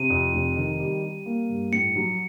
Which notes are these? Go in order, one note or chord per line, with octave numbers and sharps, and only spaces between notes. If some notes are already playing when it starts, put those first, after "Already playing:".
Already playing: C3 D#7
F2
F1
D#3
G3
G3
A#3
G2
A2 C#7
F#3